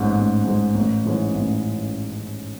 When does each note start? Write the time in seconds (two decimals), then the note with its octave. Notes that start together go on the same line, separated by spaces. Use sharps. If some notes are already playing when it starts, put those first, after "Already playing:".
Already playing: A1 G#2 G#3
0.15 A1
0.45 G#2 G#3
0.75 A1
1.05 G#2 E3 G#3 C#4
1.35 A1